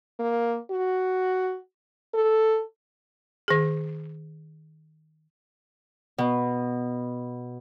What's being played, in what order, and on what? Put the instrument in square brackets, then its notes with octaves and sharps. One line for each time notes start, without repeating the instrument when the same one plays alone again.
[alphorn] A#3
F#4
A4
[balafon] D#3 G#4
[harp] B2